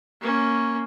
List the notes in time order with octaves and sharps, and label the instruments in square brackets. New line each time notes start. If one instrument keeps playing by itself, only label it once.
[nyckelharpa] A#3 C#4